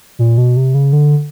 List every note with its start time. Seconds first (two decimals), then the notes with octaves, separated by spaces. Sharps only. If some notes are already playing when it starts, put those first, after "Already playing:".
0.19 A#2
0.38 B2
0.57 C3
0.74 C#3
0.93 D3